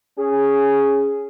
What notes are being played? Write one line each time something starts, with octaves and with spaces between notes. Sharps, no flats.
C#4 G#4